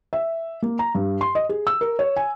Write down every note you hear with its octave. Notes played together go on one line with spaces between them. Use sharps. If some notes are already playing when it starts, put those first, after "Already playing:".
E5
A#3
A#5
G2
C6
D#5
G#4
E6
A#4
C#5
G#5